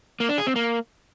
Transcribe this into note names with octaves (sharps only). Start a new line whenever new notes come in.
A#3
D4
G#4
C4
A#3